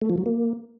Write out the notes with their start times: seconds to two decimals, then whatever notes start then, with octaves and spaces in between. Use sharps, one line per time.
0.01 A3
0.10 F3
0.18 F#3
0.26 A#3